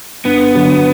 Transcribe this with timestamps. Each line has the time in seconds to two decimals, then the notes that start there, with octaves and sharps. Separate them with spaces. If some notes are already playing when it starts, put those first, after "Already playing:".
0.25 G2 B3
0.55 D3 F#3